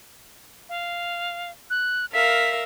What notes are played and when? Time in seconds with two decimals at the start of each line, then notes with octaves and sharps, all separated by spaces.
0.69 F5
1.70 F#6
2.13 A#4 E5 F5 B6